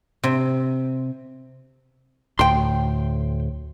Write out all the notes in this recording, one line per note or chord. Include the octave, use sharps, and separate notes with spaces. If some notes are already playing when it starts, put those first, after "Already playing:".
C3
D2 A2 G5 C6